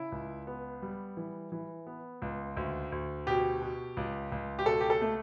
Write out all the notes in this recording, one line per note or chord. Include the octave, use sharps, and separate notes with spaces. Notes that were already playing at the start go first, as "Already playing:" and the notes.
Already playing: C#3 E4
C#2
B3
G3
E3
E3
B3
C#2
D2
D2
B2 G4
B2
C#2
C#2
G4
B2 A4
G4
A4
A3